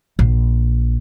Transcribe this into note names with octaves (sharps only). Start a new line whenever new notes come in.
A#1